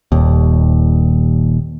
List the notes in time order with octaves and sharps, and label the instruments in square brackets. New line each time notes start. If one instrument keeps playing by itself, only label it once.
[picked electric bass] D#1 D#2